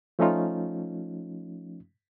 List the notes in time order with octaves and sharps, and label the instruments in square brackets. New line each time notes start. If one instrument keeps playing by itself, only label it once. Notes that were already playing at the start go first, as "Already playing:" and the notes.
[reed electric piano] F3 A3 C#4 D#4 F4